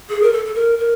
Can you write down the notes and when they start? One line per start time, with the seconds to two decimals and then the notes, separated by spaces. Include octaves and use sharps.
0.09 G#4
0.22 A#4
0.32 A4
0.45 A4
0.54 A#4
0.78 A#4